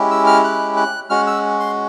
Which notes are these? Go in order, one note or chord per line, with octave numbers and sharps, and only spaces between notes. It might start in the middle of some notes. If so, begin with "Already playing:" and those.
Already playing: G#3 C#4 E4 G4
E6
F6
F#6
F#6
G#3 C#4 F#4 F6
E6
C6